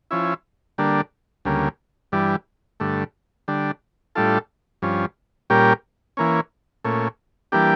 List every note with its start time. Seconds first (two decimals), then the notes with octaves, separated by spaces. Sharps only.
0.11 F3 C#4 E4
0.78 D3 G3 A#3 D4
1.45 D2 C#3 G3 A#3
2.12 G2 E3 G3 D4
2.80 G2 D3 A3
3.48 D3 G3 D4
4.15 A2 G3 D4 F4 A4
4.82 G2 F3 C#4
5.50 A#2 G3 C#4 G4 A#4
6.17 E3 A#3 C#4
6.84 A#2 A3 C#4
7.52 E3 G3 A#3 D4 G4